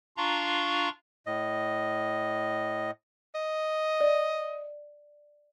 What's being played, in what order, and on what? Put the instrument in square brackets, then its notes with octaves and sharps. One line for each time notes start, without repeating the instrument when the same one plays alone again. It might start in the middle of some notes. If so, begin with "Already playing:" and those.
[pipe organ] D4 F4 F5 A#5 C6 C#6
[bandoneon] A2 D#5
[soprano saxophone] D#5
[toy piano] D5